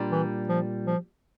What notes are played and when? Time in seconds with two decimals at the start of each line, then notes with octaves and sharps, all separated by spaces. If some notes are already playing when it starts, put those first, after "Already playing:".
Already playing: A#2 G3 D4
0.11 E3
0.49 F3
0.86 F3